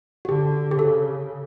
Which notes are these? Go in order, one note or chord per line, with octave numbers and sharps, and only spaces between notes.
F#4
D3 G4
G4
C#3 A4